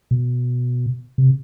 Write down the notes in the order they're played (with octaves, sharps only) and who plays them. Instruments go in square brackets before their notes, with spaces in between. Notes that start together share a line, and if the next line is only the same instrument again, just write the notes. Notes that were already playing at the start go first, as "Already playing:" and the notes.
[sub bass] B2
C3